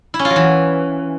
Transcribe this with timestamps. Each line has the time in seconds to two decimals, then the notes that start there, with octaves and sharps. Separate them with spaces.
0.14 E4
0.19 C#4
0.25 F4
0.30 F#3
0.36 E3